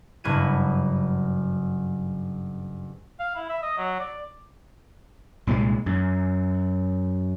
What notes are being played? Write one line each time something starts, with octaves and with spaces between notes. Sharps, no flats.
F#1 G2 F#3 B4 G#6 D#7
F5
E4
E5
D#5
F#3
D5
C2 A#2 F3 G#3
F#2